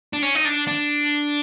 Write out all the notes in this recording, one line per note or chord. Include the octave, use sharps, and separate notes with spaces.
D4
C#4
D#4
D4
D4